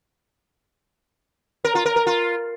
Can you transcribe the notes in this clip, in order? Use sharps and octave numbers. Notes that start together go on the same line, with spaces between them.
A#4
F4
A#4
A#4
F4